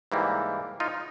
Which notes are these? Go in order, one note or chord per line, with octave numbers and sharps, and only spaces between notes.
G#2 E3 G3 A#3
D#4 F4